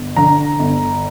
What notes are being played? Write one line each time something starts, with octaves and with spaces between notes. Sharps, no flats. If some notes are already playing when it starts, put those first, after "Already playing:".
Already playing: G1
D3 A#5
G1